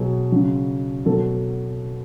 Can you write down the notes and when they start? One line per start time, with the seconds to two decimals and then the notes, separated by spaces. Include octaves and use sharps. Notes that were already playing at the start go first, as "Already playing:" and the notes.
Already playing: B2 F#3 G#4
0.32 C#3 F#3
1.05 B2 F#3 A4